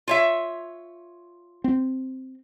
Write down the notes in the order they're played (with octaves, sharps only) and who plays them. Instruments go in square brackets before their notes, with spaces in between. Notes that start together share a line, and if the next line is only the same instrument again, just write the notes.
[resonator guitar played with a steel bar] F4 C#5 E5
[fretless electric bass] C4